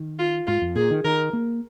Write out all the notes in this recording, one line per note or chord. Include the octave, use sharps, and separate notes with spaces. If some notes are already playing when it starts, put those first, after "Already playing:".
Already playing: D#3
F4
G#2 F4
F2
A#2 G#4
D#3
D#3 A#4
A#3